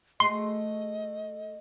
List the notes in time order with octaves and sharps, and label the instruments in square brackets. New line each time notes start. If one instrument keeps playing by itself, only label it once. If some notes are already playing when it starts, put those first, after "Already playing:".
[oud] A3 F#4 G#4 [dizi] D#5 [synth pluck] C6